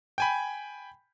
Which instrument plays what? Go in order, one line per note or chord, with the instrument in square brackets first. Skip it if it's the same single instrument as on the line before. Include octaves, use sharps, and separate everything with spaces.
[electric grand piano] G5 G#5 B5